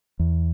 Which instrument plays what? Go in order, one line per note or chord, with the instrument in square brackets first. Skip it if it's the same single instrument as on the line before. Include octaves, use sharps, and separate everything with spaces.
[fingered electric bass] E2